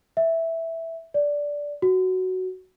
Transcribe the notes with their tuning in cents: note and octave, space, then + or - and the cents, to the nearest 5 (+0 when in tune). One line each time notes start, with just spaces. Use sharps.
E5 -5
D5 -10
F#4 +5